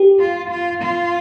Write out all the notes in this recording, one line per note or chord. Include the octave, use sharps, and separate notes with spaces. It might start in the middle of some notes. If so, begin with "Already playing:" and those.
Already playing: G4
F4
F4
F4